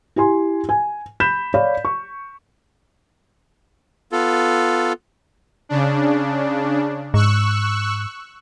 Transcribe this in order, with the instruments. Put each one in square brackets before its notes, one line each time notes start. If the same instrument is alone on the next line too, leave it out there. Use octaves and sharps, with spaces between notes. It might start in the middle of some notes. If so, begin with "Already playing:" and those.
[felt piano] E4 G4 G#5 C6
G#5
B5 G6 B6 E7
C#5 D5 F5 B5
C#6
[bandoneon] B3 F4 A4
[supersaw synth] C#3 D4
[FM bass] G#2 [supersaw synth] C#6 E6 F#6